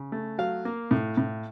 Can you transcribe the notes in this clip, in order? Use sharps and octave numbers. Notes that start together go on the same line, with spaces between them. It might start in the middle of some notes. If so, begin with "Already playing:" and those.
Already playing: C#3
A3
F#3 F5
A#3
A2
A2